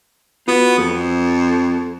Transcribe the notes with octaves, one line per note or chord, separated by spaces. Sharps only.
B3 F4 F#4
F2 C4 A4